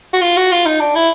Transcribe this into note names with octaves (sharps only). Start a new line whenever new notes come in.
F#4
F4
F#4
F4
D#4
D4
E4